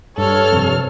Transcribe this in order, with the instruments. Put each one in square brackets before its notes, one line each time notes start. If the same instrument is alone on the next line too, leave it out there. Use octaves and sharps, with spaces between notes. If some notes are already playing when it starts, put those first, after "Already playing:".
[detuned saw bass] G2 [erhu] A4 [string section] C#5 F6
[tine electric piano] F2 C3